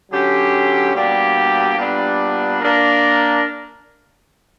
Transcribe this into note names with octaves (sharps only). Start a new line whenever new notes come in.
D3 F#3 C#4 G4
B2 G3 A#3 D4 G4
A#2 G3 B3 D4
A#3 D4 A#4